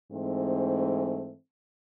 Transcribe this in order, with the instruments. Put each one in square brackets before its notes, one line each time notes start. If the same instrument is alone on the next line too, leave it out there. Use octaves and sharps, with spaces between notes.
[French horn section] G#2 E3 A3 C4